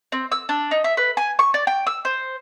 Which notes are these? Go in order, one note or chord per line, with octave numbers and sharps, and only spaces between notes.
C4
E6
D4
D#4
E5
B4
G#5
C#6
D5
G5
E6
C5